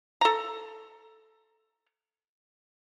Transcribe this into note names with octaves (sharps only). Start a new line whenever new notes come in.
A4 A#5